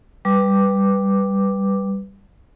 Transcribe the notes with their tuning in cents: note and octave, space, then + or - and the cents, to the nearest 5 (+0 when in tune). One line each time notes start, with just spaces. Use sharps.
G3 +0 B4 +0 D6 +0